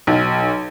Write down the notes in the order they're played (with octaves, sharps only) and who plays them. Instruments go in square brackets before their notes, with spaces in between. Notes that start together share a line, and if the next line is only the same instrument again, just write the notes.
[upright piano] B1